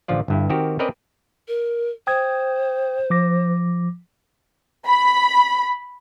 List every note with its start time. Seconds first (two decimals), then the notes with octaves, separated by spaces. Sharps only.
0.08 A1 D3 F3 F4 D5
0.28 G1 G2 E4
0.50 D#3 C4 F#4 G4 A#4
0.79 C4 C#4 A#4 B4 D5 D#5
1.48 A#4
2.07 C5 G5 D#6 G#6
3.10 F3 D6 A#6
4.86 B5